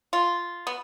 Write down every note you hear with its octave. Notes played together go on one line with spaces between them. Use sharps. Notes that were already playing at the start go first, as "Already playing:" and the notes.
F4
B3